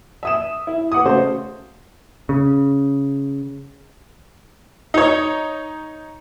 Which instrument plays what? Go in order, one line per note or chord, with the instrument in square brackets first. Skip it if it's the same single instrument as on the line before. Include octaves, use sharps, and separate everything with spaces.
[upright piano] E5 D#6 E7
E4
B4 F#5 D6 D#6
C#3 A3 F#4 C5
[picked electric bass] C#3
[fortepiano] D#4 C#5